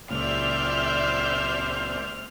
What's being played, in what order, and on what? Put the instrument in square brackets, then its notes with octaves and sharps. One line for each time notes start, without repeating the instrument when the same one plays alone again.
[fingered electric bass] C#2 A#2 [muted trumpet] C5 [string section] D5 E5 G6 [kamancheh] F6